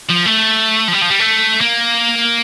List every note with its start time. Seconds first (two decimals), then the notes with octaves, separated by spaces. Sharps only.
0.09 F3
0.26 A3
0.88 F3
0.93 G3
1.02 F3
1.10 G3
1.20 A3
1.61 A#3